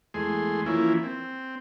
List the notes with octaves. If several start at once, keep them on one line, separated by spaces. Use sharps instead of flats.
E2 G#3 A3 G#4 C6
E3 F3 A#3 C#4 E4
C4